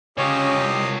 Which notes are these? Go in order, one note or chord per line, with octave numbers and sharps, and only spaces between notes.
C#3 C#4 F4 G4 C#5 D#5
C2